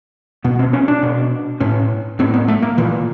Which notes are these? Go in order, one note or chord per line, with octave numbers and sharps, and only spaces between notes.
B2 B3
C4
C#4
D4
B2
A2 C#4
A2 C4
B3
A3
A#3
A#2 E3